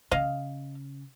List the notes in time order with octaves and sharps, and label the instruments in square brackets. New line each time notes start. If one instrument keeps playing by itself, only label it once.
[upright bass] C#3 [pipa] D#5 F5